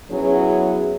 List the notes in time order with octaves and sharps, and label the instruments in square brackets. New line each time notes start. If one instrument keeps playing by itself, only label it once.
[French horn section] F#3 B3 C#4 E4 G#4